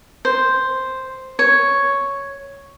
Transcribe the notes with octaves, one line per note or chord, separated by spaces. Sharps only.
C5
C#5